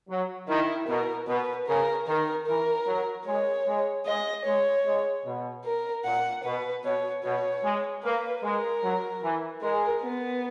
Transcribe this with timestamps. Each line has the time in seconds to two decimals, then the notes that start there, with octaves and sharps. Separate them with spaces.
0.09 F#3
0.48 D#3 E4
0.88 B2 A#4
1.27 B2 B4
1.68 C#3 A#4
2.07 D#3 A#4
2.47 E3 A#4
2.86 F#3
3.26 G#3 C#5
3.66 G#3
4.06 G#3 D#5
4.45 G#3 C#5
4.85 G#3
5.25 B2
5.64 A#4
6.05 A#2 F#5
6.44 B2 B4
6.84 B2 C#5
7.24 B2 C#5
7.63 G#3
8.03 A#3 B4
8.43 G#3 A#4
8.83 F#3
9.22 E3
9.61 G#3 A#4
10.02 B3